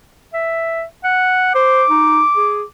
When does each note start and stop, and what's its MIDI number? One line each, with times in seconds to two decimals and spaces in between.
0.34 0.83 76
1.04 1.54 78
1.55 1.84 72
1.55 2.65 86
1.90 2.21 63
2.36 2.63 68